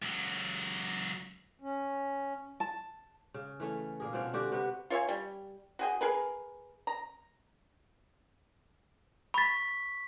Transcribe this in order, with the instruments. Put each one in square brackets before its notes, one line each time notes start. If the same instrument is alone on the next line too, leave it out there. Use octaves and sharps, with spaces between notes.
[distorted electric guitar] C#2 F#3
[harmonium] C#4
[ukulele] A5
[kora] C#3
E3 A3 C#4
A#2 A#3 G#4
B2 F3 C4 C#4
D3 F#4 G4 C5
C3 B3 F#4
[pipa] F4 C#5 E5 G#5
G3
F#4 G#4 G5
G#4 A#4 B4
A#5
[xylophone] B5 A6 [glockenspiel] C#6 B6